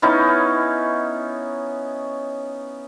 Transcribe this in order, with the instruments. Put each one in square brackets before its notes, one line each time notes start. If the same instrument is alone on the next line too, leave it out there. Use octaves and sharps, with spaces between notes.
[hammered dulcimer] B3 C#4 D#4 E4